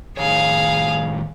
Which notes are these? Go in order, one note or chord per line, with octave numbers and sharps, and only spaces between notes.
A2 D#3 G#4 C#5 F5